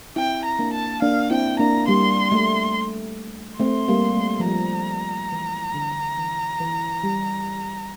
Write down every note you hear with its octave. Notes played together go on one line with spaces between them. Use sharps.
C4 E4 G5
A#5
A#3 D4
A5
A#3 D4 F5
C4 E4 G5
A#3 D4 A#5
G3 A#3 C6
A3
A3 C4 C6
G3 A#3
A3
F3
G3 A#5
E3
D3
E3
E3
G3